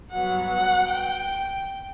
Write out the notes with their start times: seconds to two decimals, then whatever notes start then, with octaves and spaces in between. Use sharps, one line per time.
0.11 G2 F#3 B3 F#5
0.50 F#5
0.89 G5